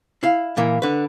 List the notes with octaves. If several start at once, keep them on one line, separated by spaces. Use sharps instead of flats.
E4 F5
A#2 E3 A#3
D3 B4